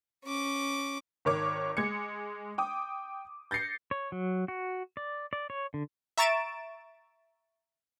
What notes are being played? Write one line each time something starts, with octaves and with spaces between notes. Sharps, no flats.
C#4 D6
G#1 D#3 C#5 D6
G#3 G#6 C#7
G5 D6 D#6
G6 A6 A#6 C7 C#7
C#5
F#3
F#4
D5
D5
C#5
D3
E5 A#5 C#6 A6 D7 E7